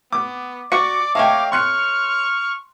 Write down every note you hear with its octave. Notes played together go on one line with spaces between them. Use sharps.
B3 D6
F#4 D5 D6 C#7
A3 C#4 D#5 F5 G5 G#5
C6 C#6 F6 F#6 C#7